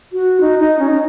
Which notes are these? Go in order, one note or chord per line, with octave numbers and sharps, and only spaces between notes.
F#4
D#4
D#4
C#4
D#4